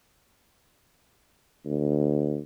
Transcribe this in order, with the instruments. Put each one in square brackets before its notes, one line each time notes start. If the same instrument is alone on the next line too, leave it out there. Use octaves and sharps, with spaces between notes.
[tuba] D2